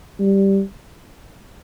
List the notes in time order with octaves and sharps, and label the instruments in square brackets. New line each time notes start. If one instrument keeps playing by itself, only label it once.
[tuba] G3